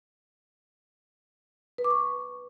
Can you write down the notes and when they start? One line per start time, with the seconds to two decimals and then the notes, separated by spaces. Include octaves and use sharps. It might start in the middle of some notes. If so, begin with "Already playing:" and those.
1.78 B4
1.84 D6
1.91 C#6